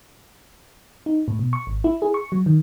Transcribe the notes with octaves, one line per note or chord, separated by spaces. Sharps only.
D#4
A2
B2
C#6
G#1
E4
G#4
C#6
F#3
D#3